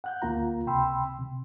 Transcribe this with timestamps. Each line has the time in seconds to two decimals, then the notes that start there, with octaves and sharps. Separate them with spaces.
0.04 F#5 F#6 G6
0.22 D2 A#3 F4 A#5
0.66 C#2 C3 G5 B5 C6 E6
1.19 C3